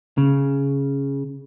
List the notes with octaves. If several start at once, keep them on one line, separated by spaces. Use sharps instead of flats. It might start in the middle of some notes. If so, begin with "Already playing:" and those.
C#3